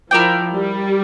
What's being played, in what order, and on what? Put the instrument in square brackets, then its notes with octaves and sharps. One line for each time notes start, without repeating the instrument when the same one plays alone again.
[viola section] F3 [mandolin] E4 A#4 D5 G5
[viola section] G3